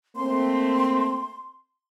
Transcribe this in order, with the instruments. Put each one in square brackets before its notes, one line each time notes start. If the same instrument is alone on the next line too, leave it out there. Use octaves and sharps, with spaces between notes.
[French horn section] A3 A#3 C4 [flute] C6